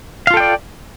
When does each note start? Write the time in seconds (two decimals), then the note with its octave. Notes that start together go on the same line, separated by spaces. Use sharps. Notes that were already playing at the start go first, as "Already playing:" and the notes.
0.27 F5
0.30 F4
0.34 A4
0.37 G5
0.40 D5